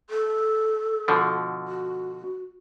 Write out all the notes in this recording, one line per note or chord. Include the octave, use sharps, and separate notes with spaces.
A4
B2 D3 F3
F#4